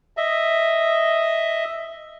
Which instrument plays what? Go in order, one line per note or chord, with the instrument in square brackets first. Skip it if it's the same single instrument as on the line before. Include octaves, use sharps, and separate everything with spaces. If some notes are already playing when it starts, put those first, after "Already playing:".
[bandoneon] D#5 E5